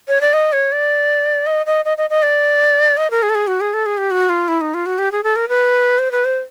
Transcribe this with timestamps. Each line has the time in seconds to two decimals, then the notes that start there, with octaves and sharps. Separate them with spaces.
0.08 C#5
0.21 D5
0.33 D#5
0.52 C#5
0.72 D5
1.46 D#5
1.66 D#5
1.85 D#5
1.97 D#5
2.10 D#5
2.22 D5
2.97 D#5
3.10 A#4
3.22 G#4
3.29 A4
3.35 G#4
3.47 F#4
3.60 G#4
3.73 A4
3.86 G#4
3.98 G4
4.11 F#4
4.29 F4
4.48 E4
4.61 D#4
4.74 F4
4.86 F#4
4.98 G4
5.12 G#4
5.23 A4
5.36 A#4
5.49 B4
5.98 C5
6.11 B4
6.25 C5